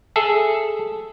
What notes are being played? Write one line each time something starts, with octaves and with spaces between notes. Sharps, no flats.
G#4 A4 E5